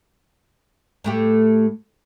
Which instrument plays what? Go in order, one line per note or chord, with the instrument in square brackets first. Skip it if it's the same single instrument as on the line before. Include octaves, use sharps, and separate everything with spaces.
[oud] A2 A3 G4